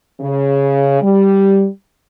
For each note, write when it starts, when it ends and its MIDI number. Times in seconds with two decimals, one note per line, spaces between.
0.20 0.99 49
1.02 1.66 55